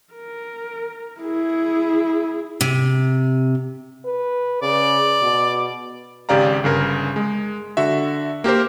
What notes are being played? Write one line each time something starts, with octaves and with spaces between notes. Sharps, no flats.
A#4
E4 G#4
C3
B4
C#3 D5
B2
G#1 C#3 G4 D5 F5 A#5
G1 C#3 A#4
G#3
D3 F#4 E5
A#3 G4 A#4 C5